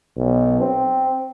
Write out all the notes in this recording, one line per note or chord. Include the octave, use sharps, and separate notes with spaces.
B1
C4